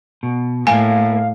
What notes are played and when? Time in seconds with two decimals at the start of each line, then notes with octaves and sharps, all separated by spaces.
0.23 B2
0.67 A2 A#3 F5 G#5